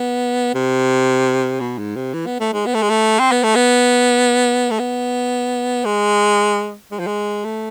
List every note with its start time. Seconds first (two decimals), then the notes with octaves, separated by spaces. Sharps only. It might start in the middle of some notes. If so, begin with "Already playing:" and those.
Already playing: B3
0.54 C3
1.60 B2
1.78 G#2
1.96 C3
2.14 E3
2.26 B3
2.40 A3
2.54 G#3
2.66 B3
2.74 A3
2.82 G#3
2.90 A3
3.19 C4
3.32 B3
3.43 A3
3.55 B3
4.70 A3
4.79 B3
5.85 G#3
6.92 G#3
6.99 F3
7.07 G#3
7.45 A3